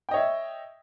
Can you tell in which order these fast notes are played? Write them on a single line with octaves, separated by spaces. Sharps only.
G5 D#5 C#5 E5